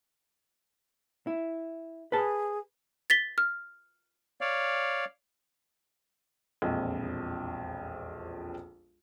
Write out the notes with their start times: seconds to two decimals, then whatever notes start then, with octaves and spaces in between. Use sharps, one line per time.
1.27 E4
2.12 G#4 B4 A5
3.10 A6 B6 G7
3.38 F6
4.41 C#5 D5 F5
6.62 E1 A#1 F2 D#5